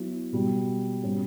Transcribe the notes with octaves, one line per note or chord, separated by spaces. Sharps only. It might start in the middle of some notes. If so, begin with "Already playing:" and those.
Already playing: F#3 B3 E4
B2 G3 B3 F#4
B2 G3 C#4